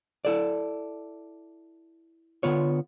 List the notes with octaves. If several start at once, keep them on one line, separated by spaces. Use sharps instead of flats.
E4 A4 D5
D3 B3 F4 C#5